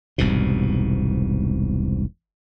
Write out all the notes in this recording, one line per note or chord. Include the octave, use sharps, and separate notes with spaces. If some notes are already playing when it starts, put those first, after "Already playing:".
E1 C2 G#2 B2